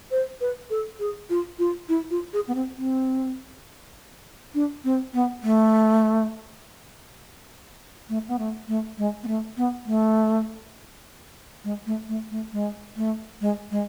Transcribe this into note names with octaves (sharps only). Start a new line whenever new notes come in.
C5
B4
A4
G#4
F4
F4
E4
F4
G#4
B3
C4
C4
D4
C4
B3
A3
A3
B3
A3
A3
G#3
B3
A3
B3
A3
G#3
A3
A3
A3
G#3
A3
G#3
G#3